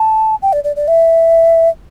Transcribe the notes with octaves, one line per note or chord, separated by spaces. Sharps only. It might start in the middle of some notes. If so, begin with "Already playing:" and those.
Already playing: A5
G5
D5
D5
D5
E5